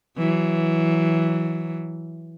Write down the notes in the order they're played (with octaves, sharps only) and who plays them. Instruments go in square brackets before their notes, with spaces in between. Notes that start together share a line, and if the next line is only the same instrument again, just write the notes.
[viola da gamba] E3 F#3